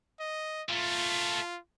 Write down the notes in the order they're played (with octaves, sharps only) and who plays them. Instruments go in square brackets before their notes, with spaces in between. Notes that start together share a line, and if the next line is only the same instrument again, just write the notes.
[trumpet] D#5
[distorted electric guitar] A#2 A3 [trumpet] F4